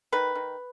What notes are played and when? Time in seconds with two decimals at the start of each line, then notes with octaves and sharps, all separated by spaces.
0.12 D#3 B4
0.35 D#3